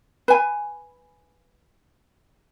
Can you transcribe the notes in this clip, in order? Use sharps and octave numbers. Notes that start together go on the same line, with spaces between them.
B4 G#5